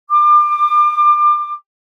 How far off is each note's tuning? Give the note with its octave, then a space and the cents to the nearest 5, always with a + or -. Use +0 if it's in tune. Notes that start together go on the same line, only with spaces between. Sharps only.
D6 +30